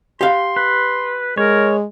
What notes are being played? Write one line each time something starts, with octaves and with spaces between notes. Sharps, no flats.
G4 F5 C6
B4
G#3 A#4 C#5